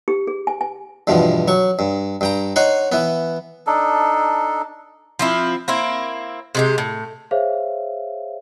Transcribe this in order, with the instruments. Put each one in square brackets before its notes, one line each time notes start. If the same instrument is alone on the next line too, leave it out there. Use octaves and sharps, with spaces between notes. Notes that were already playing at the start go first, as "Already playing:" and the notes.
[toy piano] G4
G#4
G#5
G#5
[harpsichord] E2 G2 B2 F3
F#3 C#6
G2
G2 G5 A#5
D#4 C#5 F#5 C6
E3 B3
[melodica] D4 D#4 A4
[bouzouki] F3 C4 E4
A#3 C4 E4
C3 G#3 G4
A2
[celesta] G#4 C5 C#5 E5 F5